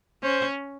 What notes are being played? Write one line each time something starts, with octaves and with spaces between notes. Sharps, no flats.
C#4 C5